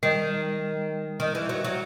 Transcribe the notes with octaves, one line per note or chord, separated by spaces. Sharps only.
D#3 G3
D#3
E3
F#3
F#3